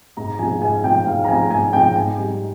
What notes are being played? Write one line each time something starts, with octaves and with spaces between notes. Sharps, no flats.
G#2 A#5
F3 G#3 G#5
G#2 G#5
F3 G#3 G5
G#2 F5
A#5
F3 G#3 G#5
G#2 G#5
F3 G#3 G5
G#2 G#5
G3